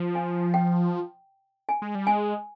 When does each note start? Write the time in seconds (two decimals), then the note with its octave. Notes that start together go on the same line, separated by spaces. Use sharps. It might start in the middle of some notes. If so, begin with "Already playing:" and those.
Already playing: F3
0.15 G#5
0.54 G5
1.69 G#5
1.82 G#3
1.95 G3
2.07 G#3 G#5